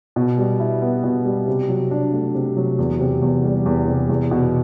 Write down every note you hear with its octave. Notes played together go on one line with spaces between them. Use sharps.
B2
G3
E4
B3
B2
G3
C3
F#3
D4
A3
C3
F#3
E2
C3
E2
G3
E2
C3
E2
B2